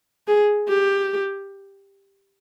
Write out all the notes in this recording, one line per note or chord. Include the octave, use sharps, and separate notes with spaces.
G#4
G4